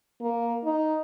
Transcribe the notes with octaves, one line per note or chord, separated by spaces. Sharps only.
A#3
D#4